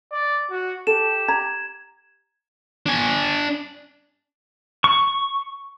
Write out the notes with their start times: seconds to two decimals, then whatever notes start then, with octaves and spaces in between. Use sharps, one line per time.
0.11 D5
0.51 F#4
0.87 G4 A4 E7
1.28 A#5 G#6
2.86 D4 G#5
4.84 C#6